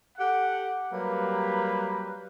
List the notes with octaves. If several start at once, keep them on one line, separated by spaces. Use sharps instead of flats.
G4 A4 F#5
F#3 G3 A#3 G4 B4